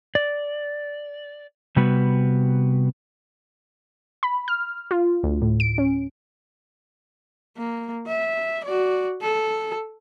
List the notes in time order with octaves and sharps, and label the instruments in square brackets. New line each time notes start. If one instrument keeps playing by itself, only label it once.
[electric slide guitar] D5
C3 G3 B3 F#4 B4
[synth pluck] B5
F6
F4
D2
A2
D7
C#4
[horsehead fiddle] A#3
E5
F#4 D5
A4